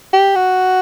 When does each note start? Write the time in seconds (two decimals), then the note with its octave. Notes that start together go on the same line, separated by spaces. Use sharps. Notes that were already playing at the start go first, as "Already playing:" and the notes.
0.13 G4
0.36 F#4